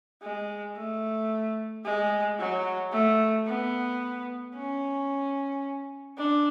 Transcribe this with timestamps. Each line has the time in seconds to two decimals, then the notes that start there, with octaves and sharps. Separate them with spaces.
0.22 G#3
0.77 A3
1.85 G#3
2.39 F#3
2.92 A3
3.47 B3
4.55 C#4
6.18 D4